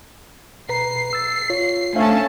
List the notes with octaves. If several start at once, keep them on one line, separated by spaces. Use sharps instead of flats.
B2 B4 A#5 C7
E6 A6
F4 C#5
A3 C#4 D4 C5 F5 A5